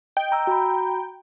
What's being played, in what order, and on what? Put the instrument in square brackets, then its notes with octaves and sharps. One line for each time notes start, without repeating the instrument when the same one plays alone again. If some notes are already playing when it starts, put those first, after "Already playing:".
[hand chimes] D#5 [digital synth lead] G5
[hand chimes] A#5 E6
F#4 A#5 B5